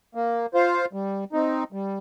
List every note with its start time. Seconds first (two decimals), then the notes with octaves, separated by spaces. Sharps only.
0.15 A#3
0.54 F4 C5 F5
0.93 G3
1.33 C4 D#4
1.72 G3